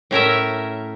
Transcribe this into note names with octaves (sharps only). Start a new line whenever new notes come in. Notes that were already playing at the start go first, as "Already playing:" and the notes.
A2 C#4 A#4 E5